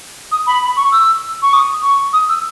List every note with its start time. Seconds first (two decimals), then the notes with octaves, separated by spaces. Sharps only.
0.32 D#6
0.47 B5
0.62 B5
0.77 C#6
0.92 E6
1.42 C#6
1.53 D#6
1.83 C#6
2.13 D#6
2.29 E6